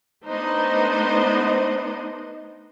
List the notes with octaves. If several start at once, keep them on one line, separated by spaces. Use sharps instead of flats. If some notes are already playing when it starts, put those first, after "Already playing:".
A3 B3 D4 D#4 C5 D#5